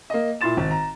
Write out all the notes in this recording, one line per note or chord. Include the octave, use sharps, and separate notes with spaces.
A#3 D#5
A#2 E4 C6 A6 E7
G#1
A#5